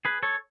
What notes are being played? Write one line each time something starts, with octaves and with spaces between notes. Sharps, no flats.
G#4 B4
A4 C#5